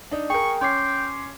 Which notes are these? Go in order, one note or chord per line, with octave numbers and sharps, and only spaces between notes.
D4 D#4
G#4 A#4 G5 C#6
C#4 G5 C6 D6 C7